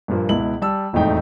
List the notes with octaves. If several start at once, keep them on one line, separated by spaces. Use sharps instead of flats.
G2 A#2 F3 A#3
C#2 B2 E4 F#7
G3 A5 E6
E1 F2 A2 A3 D#4 G5